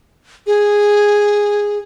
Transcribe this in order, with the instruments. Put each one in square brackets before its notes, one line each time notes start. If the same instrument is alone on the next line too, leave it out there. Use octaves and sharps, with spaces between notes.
[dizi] G#4